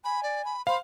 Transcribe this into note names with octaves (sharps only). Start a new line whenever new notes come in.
G#5 B5
D5
B5
C5 F5 B5